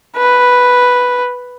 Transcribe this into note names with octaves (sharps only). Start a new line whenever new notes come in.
B4